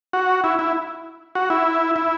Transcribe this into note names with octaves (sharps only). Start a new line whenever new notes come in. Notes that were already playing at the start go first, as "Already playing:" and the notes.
F#4
E4
E4
F#4
E4
E4